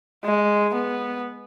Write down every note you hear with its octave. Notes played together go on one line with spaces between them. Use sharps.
G#3
B3